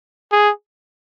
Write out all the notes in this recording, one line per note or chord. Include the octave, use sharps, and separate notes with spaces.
G#4